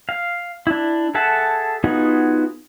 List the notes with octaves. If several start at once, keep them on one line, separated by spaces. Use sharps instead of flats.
F5
D4 E4
G#4 A4 E5 F#5 A5
B3 D#4 F4 F#4 G#4